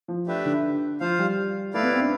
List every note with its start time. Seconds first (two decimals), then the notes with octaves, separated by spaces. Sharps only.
0.08 F3
0.27 A3 D4 G4 B4 E5
0.45 D3
1.00 F3 F4 C5 F5
1.19 G3
1.74 A3 E4 B4 D5 F5
1.83 B3
1.93 C4
2.02 D4